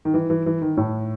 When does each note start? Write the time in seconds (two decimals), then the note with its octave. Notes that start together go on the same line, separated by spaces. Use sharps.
0.05 D#3
0.14 E3
0.30 E3
0.46 E3
0.62 D#3
0.77 A2